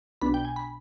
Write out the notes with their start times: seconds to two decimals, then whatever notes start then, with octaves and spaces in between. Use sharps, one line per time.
0.21 B1 B2 B3 D4 B5
0.34 G5
0.45 G#5
0.56 B5